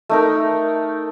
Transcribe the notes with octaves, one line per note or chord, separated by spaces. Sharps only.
A3 D#4 A#4